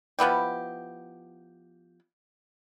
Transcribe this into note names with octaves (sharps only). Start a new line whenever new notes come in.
F3 B3 E4 G4